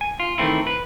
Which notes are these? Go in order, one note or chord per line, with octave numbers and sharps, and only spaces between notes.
G#5
F4
D#3 E3 A3 C4 E4
B4